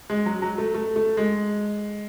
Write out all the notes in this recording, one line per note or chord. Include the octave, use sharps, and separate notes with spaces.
G#3
F#3
F#3
A3
A3
A3
G#3